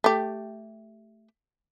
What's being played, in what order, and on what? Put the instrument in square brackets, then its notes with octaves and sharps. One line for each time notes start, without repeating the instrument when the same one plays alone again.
[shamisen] A3 G4